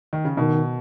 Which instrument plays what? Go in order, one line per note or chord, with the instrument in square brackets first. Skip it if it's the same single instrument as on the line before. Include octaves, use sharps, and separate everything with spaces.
[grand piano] D#3
C#3
[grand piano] B2 [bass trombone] D#3